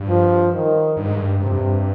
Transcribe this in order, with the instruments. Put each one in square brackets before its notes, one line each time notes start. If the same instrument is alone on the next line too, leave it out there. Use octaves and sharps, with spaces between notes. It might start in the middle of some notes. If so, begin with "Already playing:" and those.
Already playing: [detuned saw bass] G2
[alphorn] F3
D#3
[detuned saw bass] G2
G#2
G2
[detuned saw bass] G2 [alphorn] C3
[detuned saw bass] F2
G2